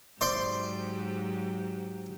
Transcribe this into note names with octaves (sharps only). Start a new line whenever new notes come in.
G#2 F#3 G4 C5 D5 C6